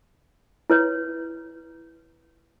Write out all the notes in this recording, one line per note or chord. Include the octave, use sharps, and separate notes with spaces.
E4 B4 C#5